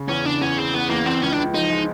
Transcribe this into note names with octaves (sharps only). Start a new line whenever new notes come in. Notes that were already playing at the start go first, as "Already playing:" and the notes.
Already playing: C#3
E2 C#4
C#3 D4
E2 C#4
C#3 C4
E2 B3
E2 A#3
E2 C4
C#2 C#4
D4
C#2
F3 D#4
G#3